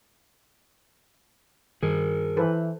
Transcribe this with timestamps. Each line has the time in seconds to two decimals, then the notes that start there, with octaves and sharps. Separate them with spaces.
1.83 G2 D#3 G#4 A#4
2.37 E3 A4 B4 C5